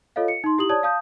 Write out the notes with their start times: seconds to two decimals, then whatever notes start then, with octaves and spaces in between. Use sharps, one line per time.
0.16 F4 A4 C#5 D#5 F5
0.28 C#7
0.44 D#4 C6
0.58 E4 G4 D#6 F#7
0.69 C#5 D5 A5 D#6 G#6
0.83 F5 A5 D#6 G6